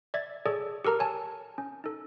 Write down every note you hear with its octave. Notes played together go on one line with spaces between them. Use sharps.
D5 E5 G#6 A6
G#4 A4 C#5 D5
G4 A4 A#4 A#5 F6
C#5 G#5 A5
C#4
D#4 A4